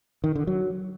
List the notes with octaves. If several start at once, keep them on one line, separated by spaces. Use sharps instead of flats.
D#3
D3
F#3